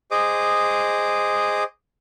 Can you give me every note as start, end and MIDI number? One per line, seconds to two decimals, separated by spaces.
0.11 1.63 68
0.11 1.63 72
0.11 1.63 75
0.11 1.63 86
0.11 1.63 87